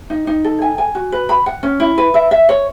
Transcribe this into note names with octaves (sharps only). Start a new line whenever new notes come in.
D#4
D#4
A4
G#5
G#5
F#4
B4
B5
F#5
C#4
E4
B4
E5
E5
C#5